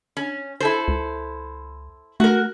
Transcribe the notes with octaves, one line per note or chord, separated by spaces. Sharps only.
C#4
E4 A4 C5
C#2
A3 F#4 A#4